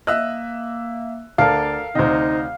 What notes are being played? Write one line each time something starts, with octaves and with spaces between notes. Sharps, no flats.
A#3 D#5 E5 E6 F#6
D2 D4 A4 A#4 D5 F5
D2 C3 D#4 C5 D#5